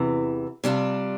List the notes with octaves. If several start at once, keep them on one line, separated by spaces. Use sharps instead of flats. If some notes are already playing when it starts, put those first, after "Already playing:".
Already playing: E2 C3 E3
C3 G3 D4 F4